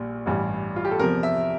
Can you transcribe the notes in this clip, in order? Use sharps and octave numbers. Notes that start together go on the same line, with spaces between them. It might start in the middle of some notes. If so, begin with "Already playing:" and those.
Already playing: A#1 A#2 G3
A1 G2 E3 G3
F4
G4
A4
E2 C3 F3 A#4
E5